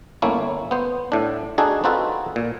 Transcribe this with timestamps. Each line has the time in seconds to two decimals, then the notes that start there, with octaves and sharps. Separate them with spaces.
0.22 G1 A3 A#3 C#4 E4
0.71 B3 C5
1.12 A2 D4
1.58 D4 D#4 F#4 G#4 A4
1.84 C4 D#4 F4 F#4 A4 B4
2.36 A#2